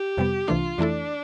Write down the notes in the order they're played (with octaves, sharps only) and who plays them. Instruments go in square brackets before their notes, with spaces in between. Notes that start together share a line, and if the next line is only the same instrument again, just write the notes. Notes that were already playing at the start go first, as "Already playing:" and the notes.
Already playing: [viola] G4
[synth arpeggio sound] F2 C3 G3 B3
[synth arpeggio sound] C2 C3 E3 A3 D4 [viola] F4
[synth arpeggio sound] F2 E3 A3 E4 A4 [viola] D4